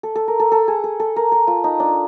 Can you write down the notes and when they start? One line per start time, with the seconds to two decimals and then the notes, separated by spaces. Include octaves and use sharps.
0.03 A4
0.15 A4
0.28 A#4
0.40 A4
0.52 A4
0.68 G#4
0.84 A4
1.00 A4
1.16 A#4
1.32 A4
1.47 F4
1.64 D#4
1.80 D4